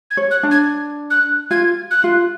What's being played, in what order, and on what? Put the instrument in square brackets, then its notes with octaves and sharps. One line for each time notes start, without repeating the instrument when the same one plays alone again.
[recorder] G#6
[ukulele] C#5
[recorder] F#6
[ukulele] D4
[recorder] G#6
F#6
[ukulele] F4 [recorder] G#6
[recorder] F#6
[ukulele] F4